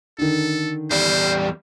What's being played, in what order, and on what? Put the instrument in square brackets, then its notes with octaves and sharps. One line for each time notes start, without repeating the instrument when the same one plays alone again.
[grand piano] D3 D#3 [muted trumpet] A4
[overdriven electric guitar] E2 G3 [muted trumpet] C5